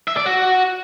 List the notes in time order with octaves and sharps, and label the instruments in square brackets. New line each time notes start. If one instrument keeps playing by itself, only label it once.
[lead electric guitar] E5
D5
F#4